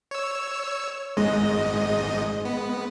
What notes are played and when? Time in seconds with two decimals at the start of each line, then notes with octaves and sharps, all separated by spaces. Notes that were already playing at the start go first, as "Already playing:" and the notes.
0.11 C#5 E6
1.17 G#1 G#2 G#3 D#5
2.45 B3